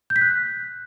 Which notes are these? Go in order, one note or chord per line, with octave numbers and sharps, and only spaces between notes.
G6
B6
F#6